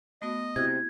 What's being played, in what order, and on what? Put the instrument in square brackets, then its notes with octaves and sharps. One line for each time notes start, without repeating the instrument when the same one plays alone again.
[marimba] A3 B3 F#4 [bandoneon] D#5
[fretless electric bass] C3 [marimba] E4 F#4 [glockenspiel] G#6